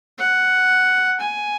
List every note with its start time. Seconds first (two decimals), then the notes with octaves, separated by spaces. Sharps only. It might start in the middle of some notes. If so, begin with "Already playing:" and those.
0.18 F#5
1.20 G#5